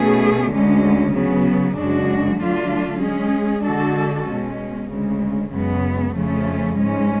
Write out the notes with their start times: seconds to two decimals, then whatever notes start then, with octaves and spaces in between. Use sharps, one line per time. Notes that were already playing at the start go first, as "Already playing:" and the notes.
Already playing: B2 A3 C#4 G#4
0.50 D2 D3 G#3 C#4
1.13 C#3 F#3 B3
1.75 F#2 C#3 G#3 D4 F#4
2.38 D3 F#3 A3 D4 F4
3.00 G#3 C#4 G#4
3.63 D3 G#3 D4 F#4 A4
4.26 B2 G#3 C#4
4.88 D2 C#3 G#3
5.51 F#2 C#3 G#3 B3
6.14 F2 C#3 F3 A3 C#4
6.77 G#2 G#3 C#4